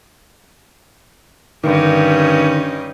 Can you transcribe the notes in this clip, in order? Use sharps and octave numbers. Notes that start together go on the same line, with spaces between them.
G2 D3 D#3 C#4 D#4